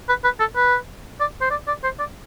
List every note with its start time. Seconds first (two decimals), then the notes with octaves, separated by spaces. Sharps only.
0.09 B4
0.24 B4
0.40 A4
0.56 B4
1.20 D5
1.41 C5
1.51 D5
1.68 D5
1.83 C5
1.99 D5